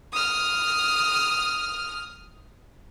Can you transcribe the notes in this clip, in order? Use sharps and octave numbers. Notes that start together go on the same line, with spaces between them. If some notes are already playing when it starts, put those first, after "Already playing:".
D#6 F6